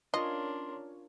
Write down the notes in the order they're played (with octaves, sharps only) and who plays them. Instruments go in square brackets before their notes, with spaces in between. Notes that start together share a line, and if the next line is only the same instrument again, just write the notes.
[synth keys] C#4 F4 C#5 [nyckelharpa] D4 A#4 [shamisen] D#5 [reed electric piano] C6